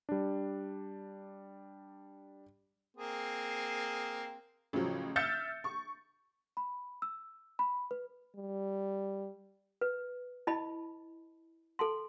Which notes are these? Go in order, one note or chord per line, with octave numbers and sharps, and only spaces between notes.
G3 D4
A#3 C4 G#4
A1 C#3 F3 F#3
E5 E6 F6 G6 A6 C#7
C#6
B5
E6
B5
B4
G3
B4
E4 D#5 A5 B5
A4 A5 C6